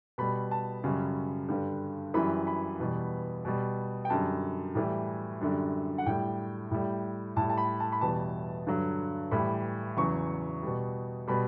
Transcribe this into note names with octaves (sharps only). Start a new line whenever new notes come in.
B2 G3 B5
A5
F#2 C#3 G3
G2 D3 G3
F#2 E3 G3 B5
B5
E2 B2 G3
B2 G3
G5
F#2 D3 G3 A5
A2 E3 G3
F#2 D3 G3
F#5
A2 G3 G5
A2 G3
A2 G3 A5
A5
B5
A5
B5
E2 B2 G3 A5
G2 D3 F#3
A2 E3 G3 B5
E2 C#3 F#3 C#6
B2 G3
B2 G3 B5